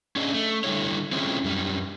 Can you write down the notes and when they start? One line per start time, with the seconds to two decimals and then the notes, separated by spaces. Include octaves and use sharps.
0.16 C#4 D4 G#4 D#5
0.33 A3
0.64 D3 G3 A3 E4 C#5
1.12 A3 C4 C#4 E4 F4 G#4
1.44 F#2 G3